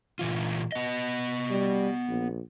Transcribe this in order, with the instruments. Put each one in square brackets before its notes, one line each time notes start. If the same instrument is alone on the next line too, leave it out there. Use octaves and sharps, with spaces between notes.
[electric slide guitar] A#2 E3 F4
B3 D#5
[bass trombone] G3
A#1